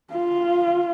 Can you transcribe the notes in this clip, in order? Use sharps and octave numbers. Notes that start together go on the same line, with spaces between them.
F4